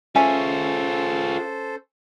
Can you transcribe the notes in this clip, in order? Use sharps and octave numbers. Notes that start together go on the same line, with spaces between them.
C#4 F4 G#4 A4 C5 E5 G#5